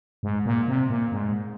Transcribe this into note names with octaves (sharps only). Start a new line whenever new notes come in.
G#2
A#2
C3
A#2
G#2